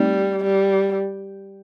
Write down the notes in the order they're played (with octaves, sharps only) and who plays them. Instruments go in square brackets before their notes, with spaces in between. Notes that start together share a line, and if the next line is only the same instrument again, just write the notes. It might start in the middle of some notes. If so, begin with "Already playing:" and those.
Already playing: [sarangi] G3 [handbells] A3 C4 D#4 G4
[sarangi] G3